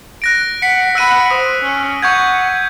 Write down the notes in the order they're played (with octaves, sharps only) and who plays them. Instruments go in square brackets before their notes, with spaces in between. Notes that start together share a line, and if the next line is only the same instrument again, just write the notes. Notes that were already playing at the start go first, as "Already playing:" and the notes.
[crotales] F#6 A#6 D7
[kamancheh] F#5 [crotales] B6 C#7
[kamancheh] F#5 B5 [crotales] E6 F#6 D#7
[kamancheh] C5 [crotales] D#6
[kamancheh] C#4
[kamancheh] F#5 [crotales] C#6 G6 G#6